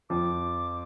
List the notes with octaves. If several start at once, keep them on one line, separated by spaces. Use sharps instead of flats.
F2 F3 D6